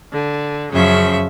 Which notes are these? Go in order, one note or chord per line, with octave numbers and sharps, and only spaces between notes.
D3
F#2 C#3 F3 E5